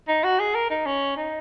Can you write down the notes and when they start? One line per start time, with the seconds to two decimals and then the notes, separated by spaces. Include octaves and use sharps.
0.08 D#4
0.24 F#4
0.39 G#4
0.55 A#4
0.70 D#4
0.86 C#4
1.17 D#4